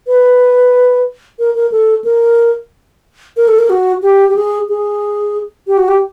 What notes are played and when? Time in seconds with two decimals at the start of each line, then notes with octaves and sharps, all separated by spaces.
0.07 B4
1.39 A#4
1.55 A#4
1.72 A4
2.04 A#4
3.37 A#4
3.48 A4
3.59 A#4
3.70 F#4
4.03 G4
4.29 G4
4.36 G#4
4.69 G#4
5.67 G4
5.77 F#4
5.88 G4